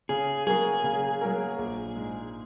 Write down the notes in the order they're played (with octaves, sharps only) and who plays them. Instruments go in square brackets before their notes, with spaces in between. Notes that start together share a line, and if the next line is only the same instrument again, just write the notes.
[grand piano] C#3 [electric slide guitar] G#4
[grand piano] F#3 A#3 F#4 A#4 [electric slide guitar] G#4
[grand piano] C#3
F#3 A#3 F#4 A#4
A#1
G#2 G#3